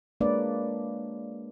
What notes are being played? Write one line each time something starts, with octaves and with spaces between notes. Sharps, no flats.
G#3 A#3 D4 B4 C#5 D5